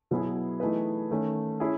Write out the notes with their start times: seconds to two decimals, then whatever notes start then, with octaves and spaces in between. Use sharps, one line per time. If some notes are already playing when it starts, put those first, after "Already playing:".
0.11 B2 F#3 B3 E4 G#4
0.60 E3 A3 D#4 G#4 B4
1.10 D#3 A3 C#4
1.60 C#4 E4 G#4